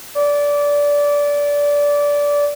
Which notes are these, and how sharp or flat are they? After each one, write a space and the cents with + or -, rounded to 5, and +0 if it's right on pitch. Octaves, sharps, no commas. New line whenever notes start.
D5 -20